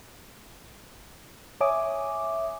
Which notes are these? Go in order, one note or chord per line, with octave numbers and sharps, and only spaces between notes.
C#5 E5 G#5 D6 D#6